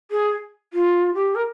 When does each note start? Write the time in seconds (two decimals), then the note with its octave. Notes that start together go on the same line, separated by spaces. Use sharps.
0.10 G#4
0.73 F4
1.14 G4
1.35 A#4